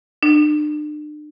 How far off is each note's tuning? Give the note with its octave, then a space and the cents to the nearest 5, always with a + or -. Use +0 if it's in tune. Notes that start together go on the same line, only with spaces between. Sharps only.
D4 +40